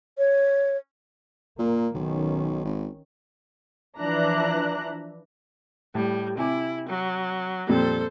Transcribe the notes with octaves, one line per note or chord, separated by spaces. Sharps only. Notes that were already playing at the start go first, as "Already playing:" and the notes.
C#5
A#2 A#3
B1 D#3 C#4
G#1
E3 F3 D4 E5 A#5 F#6
A2 G3
C3 E4 G#5 D6
F#3
F2 A#2 G3 A4 C5